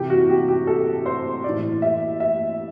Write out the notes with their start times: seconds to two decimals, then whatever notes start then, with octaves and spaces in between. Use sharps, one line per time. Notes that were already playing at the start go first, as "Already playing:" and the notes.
Already playing: C3 E3 G4
0.10 F#4
0.29 G4
0.48 G4
0.67 A4
1.06 C5
1.44 A2 E3 D5
1.82 E5
2.20 E5